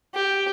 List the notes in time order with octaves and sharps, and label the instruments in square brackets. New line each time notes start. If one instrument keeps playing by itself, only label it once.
[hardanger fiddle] G4